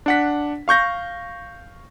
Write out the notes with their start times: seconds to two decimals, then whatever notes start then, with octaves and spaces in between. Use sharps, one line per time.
0.06 D4 F#5 B6
0.68 F5 C#6 G6 A#6